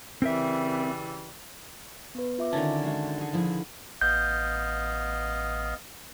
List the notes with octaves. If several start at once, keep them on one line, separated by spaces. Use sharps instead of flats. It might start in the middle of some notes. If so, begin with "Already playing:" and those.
C#3 E3 G3 C4 A#4 E5
B3 B4
F4 E5 D6
D3 D#3 C#4 E4 A5 A6
G#3 F#4 E5
G#4 F#5
F3 E4 G#4
A1 B3 D#5 F5 G6